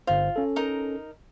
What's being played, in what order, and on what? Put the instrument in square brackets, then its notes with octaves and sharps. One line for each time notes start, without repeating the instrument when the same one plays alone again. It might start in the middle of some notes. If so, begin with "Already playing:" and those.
[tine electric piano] G1 C5 [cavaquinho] F4
[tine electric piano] C#4 A4
[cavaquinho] D#4 A#4